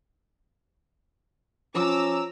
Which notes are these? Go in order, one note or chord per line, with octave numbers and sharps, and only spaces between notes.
F3 C#4 A#5 D6 E6